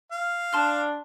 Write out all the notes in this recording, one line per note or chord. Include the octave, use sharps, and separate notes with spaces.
F5
D4 A5 C6 F6